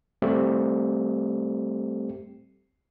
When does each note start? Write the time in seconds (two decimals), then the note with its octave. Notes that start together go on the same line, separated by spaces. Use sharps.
0.22 G3 A3 C4 G4